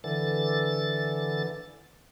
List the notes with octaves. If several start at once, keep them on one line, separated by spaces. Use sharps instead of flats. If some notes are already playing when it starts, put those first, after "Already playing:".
D3 E3 A6